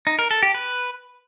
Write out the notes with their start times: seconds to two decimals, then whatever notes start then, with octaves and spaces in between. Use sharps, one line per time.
0.07 D#4
0.19 A#4
0.31 A4
0.43 G4
0.55 B4